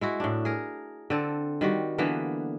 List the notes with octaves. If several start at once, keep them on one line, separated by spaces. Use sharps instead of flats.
G#3 E4 F#4
A2 D4
G#4 A#4
D3 C4 A4
D#3 G3 F#4
D3 E3 A#3 B3